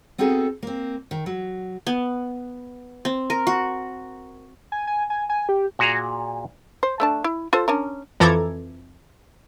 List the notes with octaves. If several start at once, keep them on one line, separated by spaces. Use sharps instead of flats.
B3 C4 D#4 F#4 G#4 A4
A#3 C4
D#3
F#3
B3
C4
A#4
F#4
G#5
G#5
G#5
G#5
G4
A#2 F#4 G#4 A#5
C5
A3 D4 A5
E4
F4 A4 C5
C#4 D4 A#4
F2 E3 A4 A#5 D6 G#6